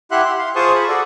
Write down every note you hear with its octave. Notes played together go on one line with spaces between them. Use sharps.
E4 G4 E5 F#5 C6 F#6
C6
F5 C6
F4 G#4 C5 A5 C#6 D#6
B5
F#4 A4 D5